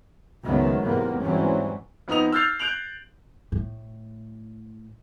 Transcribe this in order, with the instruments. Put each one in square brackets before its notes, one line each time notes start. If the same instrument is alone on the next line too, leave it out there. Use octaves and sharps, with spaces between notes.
[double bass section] C#2 G#2 D#3 F#3 A3 B3
E2 G#2 C3 A#3 B3
G#2 E3 F#3 G3 C4 C#4
[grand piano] F2 B3 D#4 A#5 D#6 F7
E6 F6 G6 A6 C7 F7
F#6 G6 D7 F7 F#7
[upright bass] A2